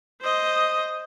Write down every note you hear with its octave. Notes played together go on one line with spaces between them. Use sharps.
C5 D#5